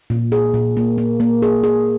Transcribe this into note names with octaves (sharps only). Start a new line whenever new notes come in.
A#2
G#4
A#2
A#3
A#3
A#3
G#4
G#4